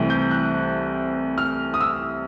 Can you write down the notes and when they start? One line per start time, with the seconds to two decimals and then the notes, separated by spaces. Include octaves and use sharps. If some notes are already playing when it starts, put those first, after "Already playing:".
Already playing: C2 C3 E3 A3
0.10 G6
0.31 F#6
1.38 F6
1.74 D#6
1.81 E6